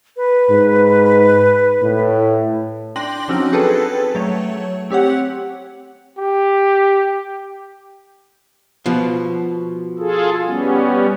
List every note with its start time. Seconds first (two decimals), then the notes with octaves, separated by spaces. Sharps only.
0.17 B4
0.50 G#2
1.82 A2
2.96 D4 G5 C6 D6 A#6 F#7
3.28 F3 F#3 C4 C#4 D#4 F#4
3.53 G#4 A4 B4 G5 A5
4.15 F#3 A3 C#5
4.90 C4 G4 C#5 F#5
6.18 G4
8.86 B2 F3
9.99 F4 G#4 A4
10.46 G3 B3 C#4